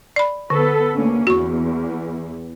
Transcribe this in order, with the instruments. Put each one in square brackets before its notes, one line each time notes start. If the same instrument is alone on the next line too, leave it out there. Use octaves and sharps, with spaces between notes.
[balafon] D5 B5
[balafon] D3 [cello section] B3 A4 B4
[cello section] D2 A#3 C#4
[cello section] E2 [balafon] F#4 C#6